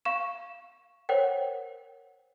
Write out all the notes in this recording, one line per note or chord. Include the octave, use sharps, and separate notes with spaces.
F5 C#6 E7
A#4 C5 C#5 F#5 G5